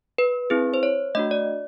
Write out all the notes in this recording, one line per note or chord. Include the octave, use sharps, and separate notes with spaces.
B4
C4 E4 G#4
C5
C#5
A3 D4 F#4 D#5
D5